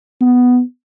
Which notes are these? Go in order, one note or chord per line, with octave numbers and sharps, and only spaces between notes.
B3